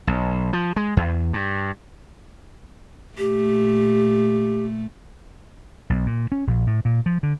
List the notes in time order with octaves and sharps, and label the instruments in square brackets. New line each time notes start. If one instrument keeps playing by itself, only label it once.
[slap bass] B1
F3
G#3
E2
G2
[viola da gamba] A#2 A3 [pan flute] G4
[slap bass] B1
A#2
C#4
A#1
A2
A#2
F3
D3